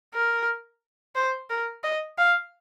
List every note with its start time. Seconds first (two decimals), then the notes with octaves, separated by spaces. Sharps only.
0.14 A#4
1.15 C5
1.50 A#4
1.84 D#5
2.18 F5